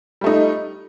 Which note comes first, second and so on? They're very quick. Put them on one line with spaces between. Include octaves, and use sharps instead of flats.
G3 A3 D#4